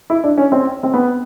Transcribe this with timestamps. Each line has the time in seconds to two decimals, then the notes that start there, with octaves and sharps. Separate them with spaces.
0.10 E4
0.24 D4
0.38 C#4
0.52 C4
0.83 C4
0.93 B3